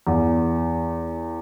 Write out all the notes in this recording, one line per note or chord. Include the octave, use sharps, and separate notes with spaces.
E2